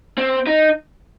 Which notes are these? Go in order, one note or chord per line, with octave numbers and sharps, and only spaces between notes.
C4
D#4